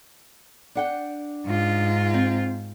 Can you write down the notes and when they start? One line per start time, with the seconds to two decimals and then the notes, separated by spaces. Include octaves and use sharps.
0.75 D4 F#5 G5
1.45 G#2 F4
2.14 C4